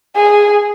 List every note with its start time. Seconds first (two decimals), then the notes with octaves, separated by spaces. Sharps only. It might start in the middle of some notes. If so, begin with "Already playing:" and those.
0.16 G#4